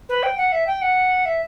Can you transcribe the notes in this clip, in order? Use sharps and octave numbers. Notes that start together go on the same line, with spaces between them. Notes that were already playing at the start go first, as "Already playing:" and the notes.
B4
G5
F#5
E5
G5
F#5
E5